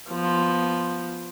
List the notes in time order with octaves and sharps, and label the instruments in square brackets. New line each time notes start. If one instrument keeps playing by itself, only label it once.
[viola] F3 B3